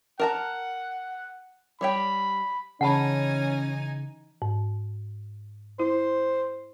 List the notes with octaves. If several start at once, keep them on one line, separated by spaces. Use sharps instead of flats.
A#4 F#5 A5 A#5
G3 C#5 G5 B5
C#3 E3 C#4 D#4 F#5 G#5 A5 B5
G#2
E4 C5